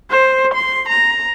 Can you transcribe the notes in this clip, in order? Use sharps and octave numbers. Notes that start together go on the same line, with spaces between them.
C5
C6
A#5